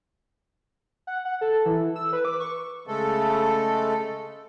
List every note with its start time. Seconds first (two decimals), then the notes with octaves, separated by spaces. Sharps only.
1.07 F#5
1.25 F#5
1.41 A4
1.66 E3
1.96 E6
2.13 B4
2.25 D6
2.40 C#6
2.87 C#3 G#3 A3 A4